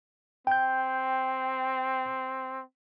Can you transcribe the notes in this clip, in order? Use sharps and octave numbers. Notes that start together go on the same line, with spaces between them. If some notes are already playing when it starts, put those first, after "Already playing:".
C4 G5 G6